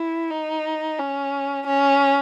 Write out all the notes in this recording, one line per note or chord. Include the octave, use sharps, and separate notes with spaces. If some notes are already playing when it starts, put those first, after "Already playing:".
Already playing: E4
D#4
C#4
C#4